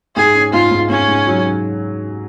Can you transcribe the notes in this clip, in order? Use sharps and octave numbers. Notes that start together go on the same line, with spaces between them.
G#2 G#4
C#4
G#2 F4
G#2
G#2 C#4
G#2
F#3